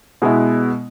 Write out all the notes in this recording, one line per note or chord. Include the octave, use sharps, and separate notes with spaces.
B2 G#3 B3 E4